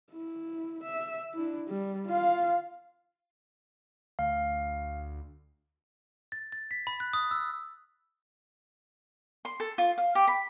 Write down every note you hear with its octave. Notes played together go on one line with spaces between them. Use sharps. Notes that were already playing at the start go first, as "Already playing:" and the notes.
E4
E5
D4 E4
G3
F4 F5
D2 F5
A6
A6
B6
B5
F#6
D#6
E6
C6
A4
F4
F5
G4
B5